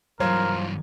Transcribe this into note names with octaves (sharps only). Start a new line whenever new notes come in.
G2 E3 F#3 F4 A#4 C5 G#6